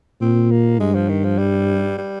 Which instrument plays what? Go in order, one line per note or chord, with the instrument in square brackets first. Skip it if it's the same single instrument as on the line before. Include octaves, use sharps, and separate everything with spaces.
[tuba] A#2 [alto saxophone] C4
[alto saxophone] A#3
[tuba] G2 [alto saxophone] G#3
[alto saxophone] F3
D#3
F3
G3
G3